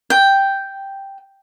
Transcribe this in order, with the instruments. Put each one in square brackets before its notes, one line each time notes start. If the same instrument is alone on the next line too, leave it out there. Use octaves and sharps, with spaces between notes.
[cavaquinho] G5